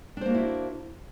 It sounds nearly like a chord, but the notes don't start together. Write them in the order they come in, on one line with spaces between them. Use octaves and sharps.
D4 C5 A#3 F#4 E4